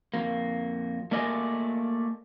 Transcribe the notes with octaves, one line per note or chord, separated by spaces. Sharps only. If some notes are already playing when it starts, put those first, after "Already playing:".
F2 A#3
A3 A#3 A#4 D5 D#5 G#5